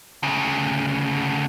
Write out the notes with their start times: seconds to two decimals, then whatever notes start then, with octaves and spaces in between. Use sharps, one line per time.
0.23 D2 C#3